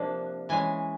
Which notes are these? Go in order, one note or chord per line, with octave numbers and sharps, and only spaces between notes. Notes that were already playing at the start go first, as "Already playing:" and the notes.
Already playing: C3 F3 A#3 D4
E3 G#3 C#4 G#5